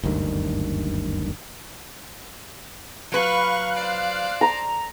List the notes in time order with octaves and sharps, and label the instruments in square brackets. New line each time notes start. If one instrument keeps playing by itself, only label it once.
[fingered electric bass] F#1 D2 G2 D#3
[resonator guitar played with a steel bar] F#3 B4 [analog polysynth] F5 F#6 [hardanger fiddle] C#6
[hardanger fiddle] C5 D5
[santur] A#5